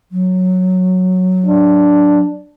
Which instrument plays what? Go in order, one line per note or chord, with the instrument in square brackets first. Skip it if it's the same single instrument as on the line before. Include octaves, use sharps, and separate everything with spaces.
[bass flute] F#3
[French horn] D4